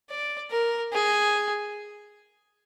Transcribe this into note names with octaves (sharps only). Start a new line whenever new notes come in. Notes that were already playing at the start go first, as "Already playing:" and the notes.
D5
A#4
G#4